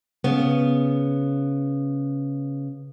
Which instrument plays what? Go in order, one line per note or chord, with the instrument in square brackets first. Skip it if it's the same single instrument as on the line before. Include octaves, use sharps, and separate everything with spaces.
[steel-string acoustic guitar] C#3 B3